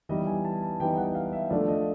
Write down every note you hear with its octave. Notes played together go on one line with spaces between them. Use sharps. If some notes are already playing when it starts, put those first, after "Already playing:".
E3 G3 B3 D#4 D#5
G#5
A5
A5
E3 G3 B3 D#4 G5
F#5
F5
E5
F3 A3 D4 D5
D#5